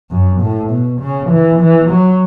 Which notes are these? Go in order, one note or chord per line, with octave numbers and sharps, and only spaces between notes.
F#2
A2
B2
C#3
E3
E3
F#3